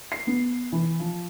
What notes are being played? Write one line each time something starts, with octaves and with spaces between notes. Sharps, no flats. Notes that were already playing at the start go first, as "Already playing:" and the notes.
C7
B3
E3
F3